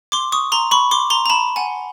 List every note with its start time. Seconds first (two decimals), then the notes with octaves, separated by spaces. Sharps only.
0.12 C6 D6
0.32 C#6 D#6
0.52 A#5 C6
0.71 B5 C#6
0.91 C6 D6
1.10 A#5 C6
1.26 A#5
1.30 A5 B5
1.56 F#5 G#5